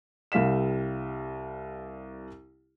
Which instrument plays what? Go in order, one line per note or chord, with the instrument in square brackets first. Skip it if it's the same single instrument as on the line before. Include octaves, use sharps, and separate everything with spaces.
[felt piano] C2 G3 F5 B6 E7